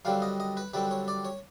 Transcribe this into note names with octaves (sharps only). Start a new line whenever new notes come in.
F#2 D3 G3 C4 F5
D#5
D#5
B4
F#2 D3 G3 C4 B4
C#5
D5
C#5